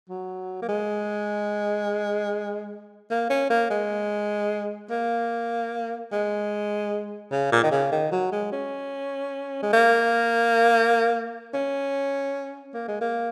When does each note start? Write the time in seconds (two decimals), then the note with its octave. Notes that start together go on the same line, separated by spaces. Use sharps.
0.09 F#3
0.62 A#3
0.69 G#3
3.10 A#3
3.30 C#4
3.50 A#3
3.70 G#3
4.90 A#3
6.12 G#3
7.31 C#3
7.52 A#2
7.63 D#3
7.71 C#3
7.92 D#3
8.12 F#3
8.32 G#3
8.52 C#4
9.62 G#3
9.73 A#3
11.54 C#4
12.74 A#3
12.88 G#3
13.01 A#3